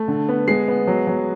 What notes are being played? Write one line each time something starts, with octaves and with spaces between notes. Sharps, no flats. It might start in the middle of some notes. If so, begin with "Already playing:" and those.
Already playing: A3
D3
B3
G#3 C7
B3
F#3
F#3